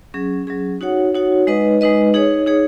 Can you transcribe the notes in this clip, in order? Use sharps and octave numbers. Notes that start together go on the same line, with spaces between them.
F#3 C#4 G#4
F#3 C#4 G#4
D#4 F#4 C#5 F#5
D#4 F#4 C#5 F#5
G#3 D#4 B4 D#5
G#3 D#4 B4 D#5
D#4 G#4 C#5
D#4 G#4 C#5